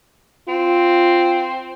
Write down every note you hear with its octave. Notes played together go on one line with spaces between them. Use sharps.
C4 F4